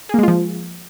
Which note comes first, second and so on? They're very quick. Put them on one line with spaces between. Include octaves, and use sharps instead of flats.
G#4 A#3 G#3 F4 F3